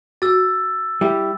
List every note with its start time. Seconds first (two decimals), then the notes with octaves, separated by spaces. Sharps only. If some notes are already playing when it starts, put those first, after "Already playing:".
0.22 F#4 E6 A6
1.01 G3 E4 G4